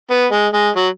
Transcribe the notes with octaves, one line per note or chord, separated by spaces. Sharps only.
B3
G#3
G#3
F#3